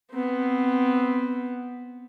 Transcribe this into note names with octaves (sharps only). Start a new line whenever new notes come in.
B3 C4